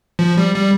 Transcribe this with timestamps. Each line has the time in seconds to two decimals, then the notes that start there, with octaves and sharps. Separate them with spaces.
0.19 F3
0.37 G3
0.55 G3